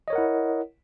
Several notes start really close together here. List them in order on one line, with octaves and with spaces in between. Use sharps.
D#5 C#5 A#4 F#5 E4